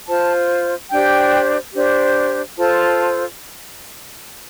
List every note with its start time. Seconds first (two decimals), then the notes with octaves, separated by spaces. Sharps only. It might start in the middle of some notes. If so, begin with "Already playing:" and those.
0.07 F4 C5 A5
0.90 D4 G4 C5 G5
1.74 D4 G4 C5
2.57 F4 A4 C5 A5